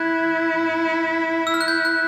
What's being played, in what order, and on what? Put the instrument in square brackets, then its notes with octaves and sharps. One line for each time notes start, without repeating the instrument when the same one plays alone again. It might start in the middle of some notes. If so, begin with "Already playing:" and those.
Already playing: [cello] E4 [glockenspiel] F#6 G#6
[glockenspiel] E6
F6
F#6
G6
F#6